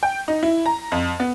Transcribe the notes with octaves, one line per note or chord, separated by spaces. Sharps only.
G5
D#4
E4
A#5
F2
B3